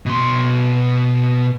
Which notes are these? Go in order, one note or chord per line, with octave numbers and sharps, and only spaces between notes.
B2 C6